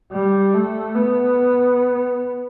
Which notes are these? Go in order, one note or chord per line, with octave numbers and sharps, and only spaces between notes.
G3
A3
B3